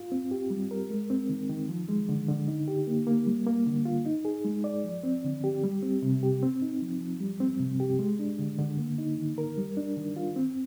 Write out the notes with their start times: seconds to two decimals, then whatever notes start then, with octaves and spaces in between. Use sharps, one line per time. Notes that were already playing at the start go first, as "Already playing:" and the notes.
Already playing: F4
0.12 C4
0.31 G4
0.50 G3
0.71 A#4
0.90 G#3
1.10 C4
1.29 D#3
1.49 D#3
1.69 F3
1.89 G#3
2.09 D3
2.29 D3
2.48 D#4
2.68 G4
2.87 A#3
3.07 A#3
3.27 G3
3.47 A#3
3.66 D3
3.85 F4
4.06 D#4
4.25 G#4
4.45 G#3
4.64 D5
4.84 F3
5.03 C4
5.24 D3
5.44 G4
5.63 G3
5.83 C4
6.02 C3
6.23 G4
6.43 C4
6.62 D#4
6.82 F3
7.01 F3
7.20 G3
7.40 C4
7.60 C3
7.80 G4
7.99 G#3
8.19 D4
8.39 D3
8.59 D3
8.78 A#3
8.98 D#4
9.18 D#3
9.38 A#4
9.58 G3
9.77 D4
9.97 D#3
10.16 F4
10.36 C4